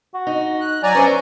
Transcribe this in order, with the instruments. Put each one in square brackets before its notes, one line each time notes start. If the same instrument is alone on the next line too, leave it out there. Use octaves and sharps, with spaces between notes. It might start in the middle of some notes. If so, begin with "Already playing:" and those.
[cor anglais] F#4
[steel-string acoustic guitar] D#4
[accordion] F#6
[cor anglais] F#3 [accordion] D5 G#5 A#5
[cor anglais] C#4 [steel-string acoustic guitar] B4 C5 E5